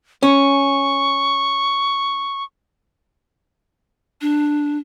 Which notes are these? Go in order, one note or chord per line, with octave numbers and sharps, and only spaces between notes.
C#4 C#6
D4